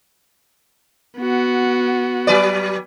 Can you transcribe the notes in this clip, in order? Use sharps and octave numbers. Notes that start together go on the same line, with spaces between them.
B3 F#4
F#3 B4 D5